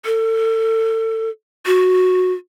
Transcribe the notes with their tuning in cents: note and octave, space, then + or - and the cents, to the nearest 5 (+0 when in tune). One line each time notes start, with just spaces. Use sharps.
A4 +30
F#4 -10